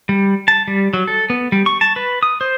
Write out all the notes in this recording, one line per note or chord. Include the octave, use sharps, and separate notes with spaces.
G3
A5
G3
F#3
A4
B3
G3
C#6
A5
B4
D#6
C5